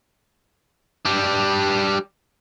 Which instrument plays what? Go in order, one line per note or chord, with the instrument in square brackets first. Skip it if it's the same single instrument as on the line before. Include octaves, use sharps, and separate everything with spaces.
[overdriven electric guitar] G3 D4